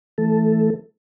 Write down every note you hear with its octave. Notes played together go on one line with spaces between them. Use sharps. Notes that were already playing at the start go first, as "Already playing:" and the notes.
E3 A3 A4